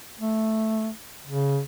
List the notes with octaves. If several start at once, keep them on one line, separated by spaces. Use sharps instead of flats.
A3
C#3